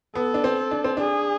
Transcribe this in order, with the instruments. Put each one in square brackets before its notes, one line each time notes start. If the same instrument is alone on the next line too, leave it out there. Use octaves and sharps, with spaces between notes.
[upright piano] B3 [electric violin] A4
[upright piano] D4
C4
D4
C4
[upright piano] D4 [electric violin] G#4